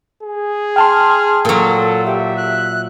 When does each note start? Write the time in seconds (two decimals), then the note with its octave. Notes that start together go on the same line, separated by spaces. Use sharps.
0.23 G#4
0.76 G5 A5 C6 F6
1.45 A#2 F#3 A4
2.06 G4 E5
2.37 F#6